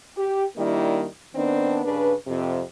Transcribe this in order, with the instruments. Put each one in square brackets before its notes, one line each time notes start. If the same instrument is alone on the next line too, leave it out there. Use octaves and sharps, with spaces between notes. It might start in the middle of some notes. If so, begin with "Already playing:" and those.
[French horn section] G4
D#3 G3 A#3 D4 E4
D#3 B3 C4 D4
G2 C#3 D4 B4
F2 C3